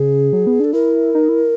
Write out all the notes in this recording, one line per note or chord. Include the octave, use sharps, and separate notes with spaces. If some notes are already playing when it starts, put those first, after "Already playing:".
Already playing: C#3 G#4
F#3
B3
D4 A4
E4 A#4
D#4
E4